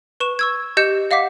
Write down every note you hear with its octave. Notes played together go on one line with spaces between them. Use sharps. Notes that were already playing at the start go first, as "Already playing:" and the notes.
B4 C#6 E7
C#6 E6 G#6
G4 D#5 G6 C#7 E7
D#5 F5 F#5 D6 B6